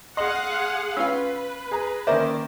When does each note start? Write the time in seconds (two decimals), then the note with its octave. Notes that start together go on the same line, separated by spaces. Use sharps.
0.17 G#4 D#5 F5 F#5 C6 F#7
0.96 C#4 F4 B4 F5 E6
1.71 G#4 A#5
2.07 D#3 A#3 C#4 A#4 C5 D5 E5